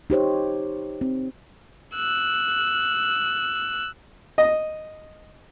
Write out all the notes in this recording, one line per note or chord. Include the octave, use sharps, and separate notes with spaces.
D#4 G4 C5 C#5
C4
E6 F#6
D#5